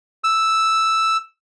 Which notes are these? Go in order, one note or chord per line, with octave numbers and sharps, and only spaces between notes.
E6